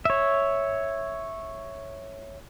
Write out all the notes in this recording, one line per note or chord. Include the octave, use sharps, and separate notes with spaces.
C#5 E5